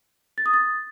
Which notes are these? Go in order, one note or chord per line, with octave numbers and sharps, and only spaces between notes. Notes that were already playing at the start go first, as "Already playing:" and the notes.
A6
D#6
A6